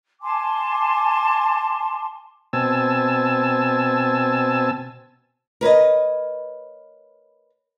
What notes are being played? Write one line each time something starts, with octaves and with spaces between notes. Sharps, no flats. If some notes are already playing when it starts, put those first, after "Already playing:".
G#5 A5 C6 D6
B2 C4 G#5 A5 E6
A#4 B4 C#5 D#5